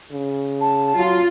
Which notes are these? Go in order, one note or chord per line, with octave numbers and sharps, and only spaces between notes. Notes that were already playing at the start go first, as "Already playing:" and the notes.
C#3
A5
F#3 F4